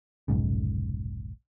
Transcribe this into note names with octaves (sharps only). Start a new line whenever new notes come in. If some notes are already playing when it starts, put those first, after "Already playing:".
F1 B1 G#2 C#3